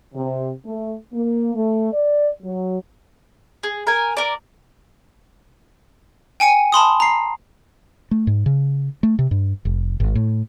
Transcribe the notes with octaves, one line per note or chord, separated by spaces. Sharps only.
C3
A3
A#3
A3
D5
F#3
G#4
A#4 G#5
A#4 D5
G5 G#5 C#7 D#7
A5 B5 C6 D#6
A#5 C7
A3
G#2
C#3
A3
C3
G2
F1
G#1
A2